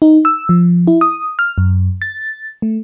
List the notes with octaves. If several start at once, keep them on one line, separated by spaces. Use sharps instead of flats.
D#4
E6
F3
E4
D#6
F6
F#2
A6
A3